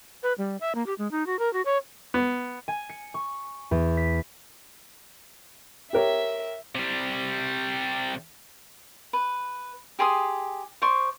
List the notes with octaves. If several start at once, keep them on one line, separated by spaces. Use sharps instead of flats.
B4
G3
E5
A#3
G4
G#3
D#4
F#4
A#4
F#4
C#5
B3
G#5
C#7
C#6
E2
B6
G4 A#4 C#5 E5
C3 G3
B4
G4 G#4 C6 D#6
C5 D5 C6 C#6